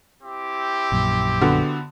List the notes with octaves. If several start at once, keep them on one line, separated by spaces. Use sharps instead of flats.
C4 E4 G4
A#1 F#2 A#2
D3 B3 F#4